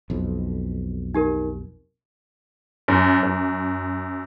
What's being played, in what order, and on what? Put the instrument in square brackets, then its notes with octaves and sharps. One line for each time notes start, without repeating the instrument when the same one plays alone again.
[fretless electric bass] B1 F2
[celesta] D#4 G4 A#4
[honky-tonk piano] F#2
F#2